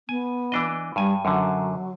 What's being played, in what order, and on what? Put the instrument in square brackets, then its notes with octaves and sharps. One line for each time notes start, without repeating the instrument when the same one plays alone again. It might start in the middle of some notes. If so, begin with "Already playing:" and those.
[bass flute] B3 [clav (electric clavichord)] G#5
[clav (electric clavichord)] E3 D4 D#5
[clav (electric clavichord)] G2 G#5 [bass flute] G3
[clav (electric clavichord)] F#2 D3 [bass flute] F#3